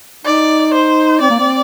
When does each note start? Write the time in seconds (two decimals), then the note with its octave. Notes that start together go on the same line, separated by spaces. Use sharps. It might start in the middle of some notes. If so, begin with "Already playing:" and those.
0.25 D#4 D5
0.73 C5
1.20 C4 D5
1.30 A#3
1.40 C4